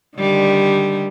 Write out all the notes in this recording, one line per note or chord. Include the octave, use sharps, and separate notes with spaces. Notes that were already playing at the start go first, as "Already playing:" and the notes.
D3 D#3 G3